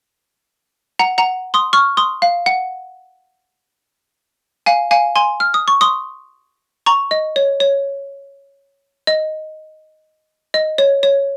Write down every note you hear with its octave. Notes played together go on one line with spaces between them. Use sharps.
F#5 A#5
F#5 A#5
C6 D#6
C#6 F6
C6 D#6
F5
F#5
F5 G#5
F5 G#5
G#5 C6
F6
D#6
C#6
C6 D#6
A#5 C#6
D#5
C#5
C#5
D#5
D#5
C#5
C#5